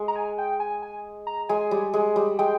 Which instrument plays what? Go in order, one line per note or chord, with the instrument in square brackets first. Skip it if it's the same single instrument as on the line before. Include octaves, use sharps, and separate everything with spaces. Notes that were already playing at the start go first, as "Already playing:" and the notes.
Already playing: [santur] G#3
[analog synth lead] A#5
G#5
G5
G#5
G#5
A#5
[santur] G#3 [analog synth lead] G#5
[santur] G3
G#3
G3
[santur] G#3 [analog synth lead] G5